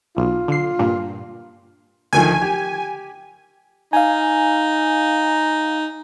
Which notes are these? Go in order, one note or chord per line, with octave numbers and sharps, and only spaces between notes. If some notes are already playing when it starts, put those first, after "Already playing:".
B1 F4
D3 C7
G2 A#2
D2 D#3 F3 G#5
G4
D#4 F5 G#5